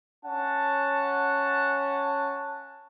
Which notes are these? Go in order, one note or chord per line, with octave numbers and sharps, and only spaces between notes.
C#4 F#5 A5